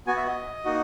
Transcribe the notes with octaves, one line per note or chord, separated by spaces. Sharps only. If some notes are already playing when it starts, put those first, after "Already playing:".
B3 F#4 G#5
E5
D#5
A#3 D#4 F#4